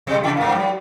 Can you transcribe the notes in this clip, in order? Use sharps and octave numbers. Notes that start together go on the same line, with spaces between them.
B2 G3
C3 E4
G2 A#3
F#3